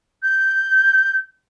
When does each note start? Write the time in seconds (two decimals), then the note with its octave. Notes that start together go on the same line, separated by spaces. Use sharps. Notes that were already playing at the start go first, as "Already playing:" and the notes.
0.23 G6